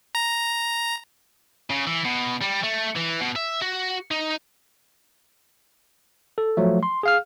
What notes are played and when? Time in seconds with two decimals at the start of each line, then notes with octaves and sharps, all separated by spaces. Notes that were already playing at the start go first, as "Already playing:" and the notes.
0.15 A#5
1.70 C#3
1.87 E3
2.05 B2
2.42 G3
2.64 A3
2.96 E3
3.21 B2
3.36 E5
3.62 F#4
4.11 D#4
6.38 A4
6.57 F3 F#3 A3
6.83 C6
7.03 G#4 F5 F6